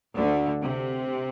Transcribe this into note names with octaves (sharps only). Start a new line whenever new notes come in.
D2 D3
C3